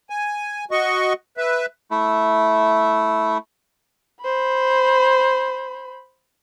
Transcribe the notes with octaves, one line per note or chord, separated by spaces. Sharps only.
G#5
F#4 D#5 C#6
B4 E5
A3 E4
C5 B5